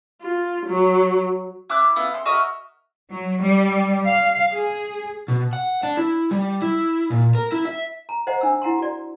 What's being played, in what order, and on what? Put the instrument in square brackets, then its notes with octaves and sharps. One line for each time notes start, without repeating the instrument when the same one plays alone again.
[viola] F4
F#3
[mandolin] E4 D6 F#6
B3 E4 F4
C6
F#4 A#4 D#5 E5
[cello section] F#3
G3
F5
G#4
[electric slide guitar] B2
F#5
D4
E4
G3
E4
A#2
A#4
E4
E5
[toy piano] A#5
C5 D#5 F#5 A#5
D4 E6
E4 F#5 A#5 C6
F#4 D5